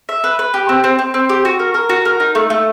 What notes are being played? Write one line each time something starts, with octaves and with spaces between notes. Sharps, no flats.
E5
B4
B4
G4
C4
C4
C4
C4
G4
F#4
A#4
A#4
F#4
A#4
D#4
A3
A3